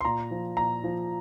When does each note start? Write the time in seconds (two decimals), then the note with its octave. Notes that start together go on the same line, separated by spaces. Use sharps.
0.01 C6
0.05 A#2 A#5
0.31 F3
0.57 A#2 A#5
0.84 F3